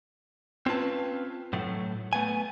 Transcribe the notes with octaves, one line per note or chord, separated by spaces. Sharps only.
C4 C#4 F4 B4 A5
A2 F#3 A3
A3 B3 G#5